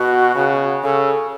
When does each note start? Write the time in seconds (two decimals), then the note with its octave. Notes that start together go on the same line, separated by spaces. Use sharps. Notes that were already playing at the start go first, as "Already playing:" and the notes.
Already playing: B2 F#4
0.36 C#3
0.83 C#3 A4